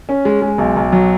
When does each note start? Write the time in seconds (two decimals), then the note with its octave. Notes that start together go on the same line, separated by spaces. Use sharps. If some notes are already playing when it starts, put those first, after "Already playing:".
0.09 C#4
0.25 G#3
0.42 G#3
0.58 B1
0.76 B1
0.92 F#3